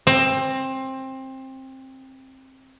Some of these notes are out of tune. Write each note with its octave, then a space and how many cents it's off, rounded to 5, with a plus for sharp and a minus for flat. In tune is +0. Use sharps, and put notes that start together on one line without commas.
C4 +20